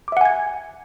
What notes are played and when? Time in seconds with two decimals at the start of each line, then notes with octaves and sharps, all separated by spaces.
0.08 D6
0.12 E5
0.17 F#5
0.21 G#5
0.25 G#6